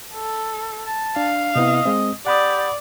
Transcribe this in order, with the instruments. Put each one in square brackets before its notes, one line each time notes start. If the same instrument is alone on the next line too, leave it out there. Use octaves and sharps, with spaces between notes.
[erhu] A4
[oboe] A5
[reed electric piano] D4 [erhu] F5
[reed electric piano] C3 B3 E4 [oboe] D#5
[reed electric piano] G#3 C4
[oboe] G4 [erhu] D5 [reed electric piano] F#5 B5 D#6